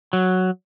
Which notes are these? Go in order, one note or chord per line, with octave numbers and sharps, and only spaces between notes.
F#3